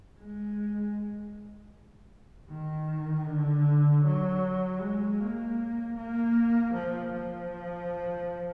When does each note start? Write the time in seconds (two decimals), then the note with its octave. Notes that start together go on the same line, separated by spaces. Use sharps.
0.19 G#3
2.50 D#3
3.26 D3
4.04 F#3
4.80 G#3
5.19 A#3
5.96 A#3
6.74 F3
7.12 F3